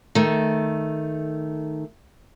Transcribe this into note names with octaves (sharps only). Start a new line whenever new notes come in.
D#3 A3